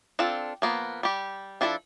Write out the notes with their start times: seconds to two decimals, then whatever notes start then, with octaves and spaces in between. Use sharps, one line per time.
0.19 C4 D4 F4 A4
0.62 F3 A#3 B3
1.03 G3 G4
1.61 F3 D4 E4 G#4 A4